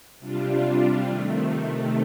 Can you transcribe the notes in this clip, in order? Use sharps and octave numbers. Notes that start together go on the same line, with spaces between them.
C3 G3 D4 F4
C3 D#3 A3